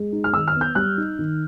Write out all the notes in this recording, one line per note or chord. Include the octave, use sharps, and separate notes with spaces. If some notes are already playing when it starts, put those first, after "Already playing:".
Already playing: G#3
D#4
F6
D#3 E6
F6
B3
G6
G3 F#6
D#4
D#3